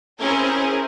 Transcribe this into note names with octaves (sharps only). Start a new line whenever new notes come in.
C4 C#4 E4 G#4 A#4